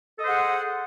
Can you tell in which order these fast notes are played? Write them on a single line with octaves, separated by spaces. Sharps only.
A4 D#5 C5 F#5 G#4